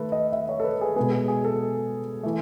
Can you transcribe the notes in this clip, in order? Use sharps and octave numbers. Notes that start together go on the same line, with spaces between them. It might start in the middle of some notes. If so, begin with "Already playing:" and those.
Already playing: D#3 A3 A4 B4
D#5
E5
C#5
A4
B4
G#4
B2 G#3 B3 G#4
G#4
G#4
A4
E3 A3